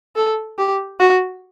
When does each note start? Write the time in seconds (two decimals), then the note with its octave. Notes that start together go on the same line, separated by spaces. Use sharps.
0.16 A4
0.59 G4
1.00 F#4